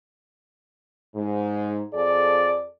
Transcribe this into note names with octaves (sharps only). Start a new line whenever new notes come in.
G#2
F2 G#4 A4 D5